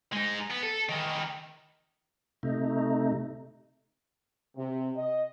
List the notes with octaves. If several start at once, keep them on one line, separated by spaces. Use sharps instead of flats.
G#3 D#4
B3
A4
D#3 E3
C3 A3 D#4
C3
D#5